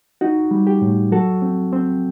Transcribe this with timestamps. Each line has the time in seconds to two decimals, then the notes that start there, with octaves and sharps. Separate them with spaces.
0.21 D#4 F#4
0.51 G3
0.67 G4
0.82 A2
1.12 F#3 F#4 A4
1.42 C4
1.72 C4